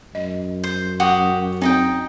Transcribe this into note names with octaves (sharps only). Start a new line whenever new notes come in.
F#2 D#5
C5
F#4 G4 D#6
C4 D#4 D#5 G5